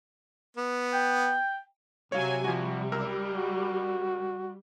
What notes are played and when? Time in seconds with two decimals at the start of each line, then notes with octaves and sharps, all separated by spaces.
0.57 B3
0.93 G5
2.12 C3 F#3 C#5 F5 G#5
2.44 F3 G3 F#4
2.92 C#2 A#4 E6
3.35 F#4